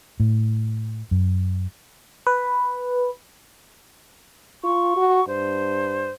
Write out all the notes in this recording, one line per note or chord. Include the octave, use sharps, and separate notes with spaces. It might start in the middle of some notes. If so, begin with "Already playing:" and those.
A2
F#2
B4
F4 C#6
F#4
G2 C5